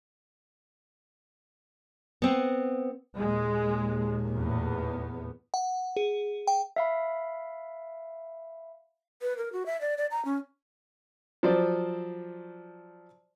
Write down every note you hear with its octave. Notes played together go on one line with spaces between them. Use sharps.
B3 C4
D#2 A#2 G#3
E2 A2 B3
F#5
G#4
G5
E5 F5 B5
B4
A#4
F#4
E5
D5
D5
A#5
C#4
F3 F#3 C5 D5